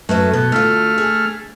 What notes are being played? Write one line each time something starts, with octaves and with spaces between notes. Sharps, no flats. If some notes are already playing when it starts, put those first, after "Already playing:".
F#2 A3 B4 E5
B2 A4
D2 A3 F4 F6
G#4